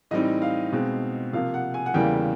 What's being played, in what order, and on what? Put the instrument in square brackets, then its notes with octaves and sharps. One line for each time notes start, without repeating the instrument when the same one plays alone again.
[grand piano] A2 E3 G3 C4 D#4 D#5
F5
B2 G#3 C4 D#4
C3 F3 A#3 F5
F#5
G#5
F#5
E2 C#3 E3 G3 A#3 G5